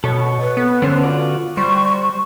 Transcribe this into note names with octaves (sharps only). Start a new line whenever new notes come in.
B2 A4 C#5 C#6
B4
B3
D3 B3 C#4 C5
F4 F#4 D5
G3 C5 C#6